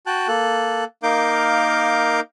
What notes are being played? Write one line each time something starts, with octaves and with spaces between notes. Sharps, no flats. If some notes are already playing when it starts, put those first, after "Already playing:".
F#4 G5 A5 F#6
A#3 A4 F#6
A#3 D#4 A#4 F5 D6 G6